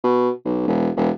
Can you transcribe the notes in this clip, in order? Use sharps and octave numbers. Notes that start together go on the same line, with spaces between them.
B2
B1
E1
E1